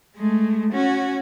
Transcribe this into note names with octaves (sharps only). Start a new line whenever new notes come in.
G#3 A3
C#4 F#4